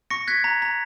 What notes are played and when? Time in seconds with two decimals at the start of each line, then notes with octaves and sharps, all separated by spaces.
0.10 C#6 A#6 C#7
0.28 F#6 G#6 B6
0.44 A#5
0.62 A#5